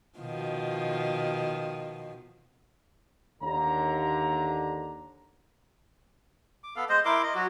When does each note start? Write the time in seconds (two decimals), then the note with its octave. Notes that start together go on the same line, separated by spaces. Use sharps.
0.18 B2 D#3 F3
3.41 D#2 D3 A#5
6.64 D6
6.76 B3 A4 F5
6.89 G#3 C5 D#5
7.05 E4 A#4 C6 D6
7.23 D#5
7.35 F#3 F#4